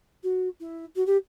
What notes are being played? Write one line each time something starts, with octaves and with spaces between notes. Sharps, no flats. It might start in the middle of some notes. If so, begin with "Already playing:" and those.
F#4
E4
F#4
G4